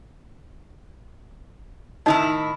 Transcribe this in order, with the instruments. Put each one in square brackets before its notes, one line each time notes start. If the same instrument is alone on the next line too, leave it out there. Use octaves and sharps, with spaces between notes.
[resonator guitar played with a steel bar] A2 D#3 E4 [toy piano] D#4 D#5 A5